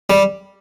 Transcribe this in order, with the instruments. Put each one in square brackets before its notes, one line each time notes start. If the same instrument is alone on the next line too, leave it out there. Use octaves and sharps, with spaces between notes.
[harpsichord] G3